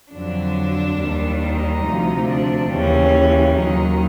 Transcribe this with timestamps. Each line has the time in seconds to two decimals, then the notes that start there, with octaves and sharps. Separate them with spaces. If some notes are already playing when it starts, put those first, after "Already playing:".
0.13 F2 D3 F#3 D4
0.99 D#2 D#3 G3
1.42 D#4
1.84 D2 C3 F3
2.28 D4
2.71 D#2 C#3 E3 G3 C#4
3.57 D#2 D#3 F#3 D#4